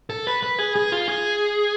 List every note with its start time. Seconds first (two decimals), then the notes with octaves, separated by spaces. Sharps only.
0.10 A4
0.27 B4
0.43 B4
0.59 G#4
0.76 G#4
0.92 F4
1.08 G#4